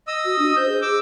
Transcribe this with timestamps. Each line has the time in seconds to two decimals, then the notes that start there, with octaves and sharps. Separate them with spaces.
0.07 D#5 D#6 E6
0.25 F#4
0.39 D4
0.56 C5 G6
0.69 G#4
0.82 D6 E6